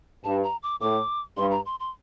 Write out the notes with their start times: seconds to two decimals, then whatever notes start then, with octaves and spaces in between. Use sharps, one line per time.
0.24 G2 A5
0.44 A#5
0.63 D6
0.81 A2 D6
1.37 G2 C6
1.51 A#5
1.66 C6
1.80 C6